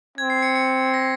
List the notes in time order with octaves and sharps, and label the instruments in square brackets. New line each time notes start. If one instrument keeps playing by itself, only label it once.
[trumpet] C4 [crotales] G#6
[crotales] C7
C#7
C#7
A#6